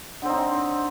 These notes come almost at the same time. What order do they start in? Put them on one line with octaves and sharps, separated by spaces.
D3 C4 D#4